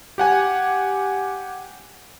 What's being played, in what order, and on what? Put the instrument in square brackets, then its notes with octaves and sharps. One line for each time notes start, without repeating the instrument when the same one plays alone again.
[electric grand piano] G4 F#5 G#5